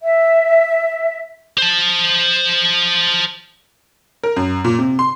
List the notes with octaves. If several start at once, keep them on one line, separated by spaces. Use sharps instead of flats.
E5
C5 A5
A#4
F#2
A#2
C3
C6